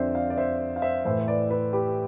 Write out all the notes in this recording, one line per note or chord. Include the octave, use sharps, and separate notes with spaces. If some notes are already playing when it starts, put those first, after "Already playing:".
Already playing: F2 D3 C5 D5 E5
D5 F5
D5
C5 E5
F5
C5 E5
A2 E3 C5 E5
C5
B4 D5
B4 D5
G4 B4